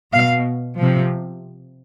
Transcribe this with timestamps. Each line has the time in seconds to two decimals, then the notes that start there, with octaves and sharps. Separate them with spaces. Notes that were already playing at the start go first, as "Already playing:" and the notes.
0.13 B2 F5
0.77 C3 F3